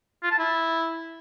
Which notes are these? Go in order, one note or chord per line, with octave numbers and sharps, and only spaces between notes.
F4
A5
E4